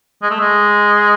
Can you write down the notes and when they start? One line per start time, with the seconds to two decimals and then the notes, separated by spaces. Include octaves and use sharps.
0.22 G#3
0.31 A3
0.40 G#3